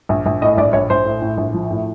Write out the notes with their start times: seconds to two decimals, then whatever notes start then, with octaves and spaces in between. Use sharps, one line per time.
0.09 A#1
0.26 A#1
0.42 A2 D#5
0.57 A#1 D5
0.73 A#1 C#5
0.90 A#1 C5
1.05 A2
1.22 A2
1.37 A#1
1.54 F3
1.70 A2